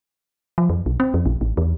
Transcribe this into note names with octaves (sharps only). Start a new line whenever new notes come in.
F3
F2
B1
C4
F2
A#1
A1
E2